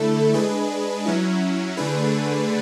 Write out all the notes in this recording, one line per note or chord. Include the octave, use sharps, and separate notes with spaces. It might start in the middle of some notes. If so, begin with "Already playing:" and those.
Already playing: D3 A3 E4 A4
G#3 D4 G#4 B4
F#3 C#4 E4
D3 A3 D4 G#4 B4